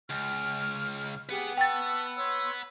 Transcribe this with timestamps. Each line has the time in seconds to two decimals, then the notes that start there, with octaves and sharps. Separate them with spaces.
0.10 C#2 C#6 F6
1.29 G4 G#4 B4 F#5
1.57 G5 A5 C#6 E6 A6
2.18 C#5 C6 E6